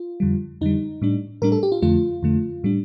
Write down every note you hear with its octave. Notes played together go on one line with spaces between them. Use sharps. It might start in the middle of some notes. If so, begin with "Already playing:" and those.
Already playing: F4
F2 D3 G3
F2 D3 G3 D#4
A2 G3 D4
A2 G3 D4 A#4
A4
G4
F4
F2 D3 A3 F4
F2 D3 A3
A2 G3 D4